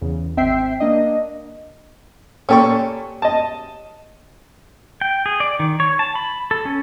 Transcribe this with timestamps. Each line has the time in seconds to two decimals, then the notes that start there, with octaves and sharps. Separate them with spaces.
0.01 E2 C#3
0.37 G#1 C4 E5 G5 C7
0.80 A#3 D4 D#5
2.49 A#2 C#4 G4 A4 C#6
3.22 D#5 A5
5.01 G5
5.26 G#4
5.40 D5
5.59 D#3
5.80 C#5
5.99 A5
6.16 B5
6.51 A4
6.65 C#4